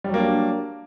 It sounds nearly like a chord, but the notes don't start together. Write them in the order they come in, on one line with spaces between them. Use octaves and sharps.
G3 F#3 A#3 D4